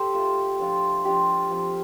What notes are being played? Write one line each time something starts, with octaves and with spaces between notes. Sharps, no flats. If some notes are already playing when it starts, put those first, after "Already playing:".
Already playing: G4 A4 C5 G5
A3 F4
F3 D4 F4
F3 D4 F4 G4
F3 C4 F4